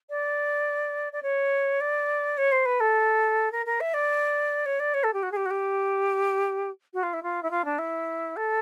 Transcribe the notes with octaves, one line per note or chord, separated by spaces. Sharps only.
D5
D5
C#5
D5
C#5
C5
B4
A4
A#4
A#4
E5
D5
C#5
D5
C#5
A4
G4
F#4
G#4
G4
F#4
G4
F#4
F4
E4
F4
E4
F4
D4
E4
A4